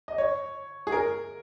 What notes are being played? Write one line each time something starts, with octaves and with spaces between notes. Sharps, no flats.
D#5
C#5
G#4
A#4